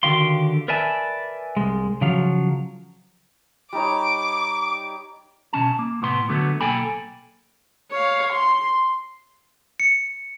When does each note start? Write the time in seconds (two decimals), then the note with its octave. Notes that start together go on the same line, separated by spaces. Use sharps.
0.03 D3 D#3 F#4 G4 F5 C6
0.68 A#4 B4 D5 E5 G#5 A5
1.57 C2 G#3
2.01 C#3 F3 F#3 F5
3.73 G3 D#4 C#5 D6
5.53 B2 G#3 C#4 A5
5.79 A#3
6.02 A2 C3 B3 C6
6.29 D3 F#3 A3 B3
6.61 B1 A#3 A4 G5 G#5 B5
7.91 C#5 F5
8.33 C6
9.80 C#7